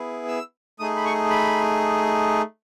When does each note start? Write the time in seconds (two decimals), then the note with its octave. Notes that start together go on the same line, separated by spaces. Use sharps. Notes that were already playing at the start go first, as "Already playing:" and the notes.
Already playing: B3 E4 G#4
0.28 E6
0.79 A3 D#4 G#4 D#6
0.96 B5
1.05 C#6
1.30 B5